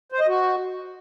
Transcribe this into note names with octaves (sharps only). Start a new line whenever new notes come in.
C5
D#5
F#4